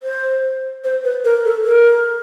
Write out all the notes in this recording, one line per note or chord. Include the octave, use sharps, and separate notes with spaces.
C5
C5
B4
A#4
A4
A#4